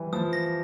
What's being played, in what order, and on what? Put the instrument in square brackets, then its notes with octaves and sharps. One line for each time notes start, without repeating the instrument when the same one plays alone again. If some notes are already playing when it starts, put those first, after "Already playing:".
Already playing: [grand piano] E3 G3
[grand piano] F3 [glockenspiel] D#6
[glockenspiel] A#6